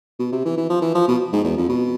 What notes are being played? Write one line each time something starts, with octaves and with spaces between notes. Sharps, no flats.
B2
C3
E3
E3
F3
E3
F3
B2
G#2
E2
F2
B2